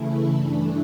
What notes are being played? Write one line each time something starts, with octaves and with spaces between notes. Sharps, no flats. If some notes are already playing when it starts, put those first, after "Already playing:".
Already playing: C#3 E3 A3 E4
G2 E3 A3 D4